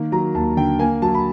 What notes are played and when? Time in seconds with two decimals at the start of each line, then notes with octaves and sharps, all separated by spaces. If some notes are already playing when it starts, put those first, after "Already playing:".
Already playing: D#3 A#3
0.12 F#3 A#5
0.34 D#2 A5
0.57 D3 G5
0.79 A#3 G#5
1.02 F#3 A5
1.15 B5